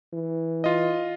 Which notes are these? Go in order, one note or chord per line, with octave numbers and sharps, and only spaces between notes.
E3
F4 D#5